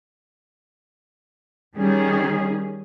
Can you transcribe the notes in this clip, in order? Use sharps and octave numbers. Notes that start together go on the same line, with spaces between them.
D#3 G3 C#4 G#4